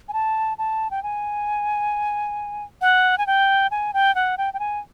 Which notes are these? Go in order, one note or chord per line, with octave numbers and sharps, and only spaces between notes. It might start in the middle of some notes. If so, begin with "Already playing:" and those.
G#5
A5
A5
G5
G#5
F#5
G#5
G5
G#5
G5
F#5
G5
G5
G#5